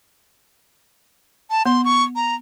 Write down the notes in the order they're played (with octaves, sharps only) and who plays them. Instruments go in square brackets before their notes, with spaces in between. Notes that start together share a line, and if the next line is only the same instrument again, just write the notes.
[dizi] A5
[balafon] B3 [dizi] C6
[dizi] C#6
A#5